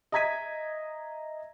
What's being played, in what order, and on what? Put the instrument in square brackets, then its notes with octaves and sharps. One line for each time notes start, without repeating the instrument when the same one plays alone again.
[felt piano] D#5 E5 A#5 G#6 B6 D#7